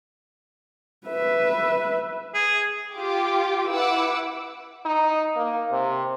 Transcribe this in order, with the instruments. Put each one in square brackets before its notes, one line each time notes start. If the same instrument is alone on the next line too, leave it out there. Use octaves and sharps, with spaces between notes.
[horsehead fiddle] B4 E5
[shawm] G#4
[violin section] F4 G4 D6
E4 B4 F#5 D6 E6
[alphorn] D#4
A#3
C3